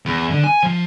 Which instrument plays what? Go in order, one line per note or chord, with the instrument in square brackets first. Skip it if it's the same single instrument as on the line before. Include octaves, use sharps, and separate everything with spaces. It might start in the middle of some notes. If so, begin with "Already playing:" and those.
[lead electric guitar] E2
D3
G#5
F3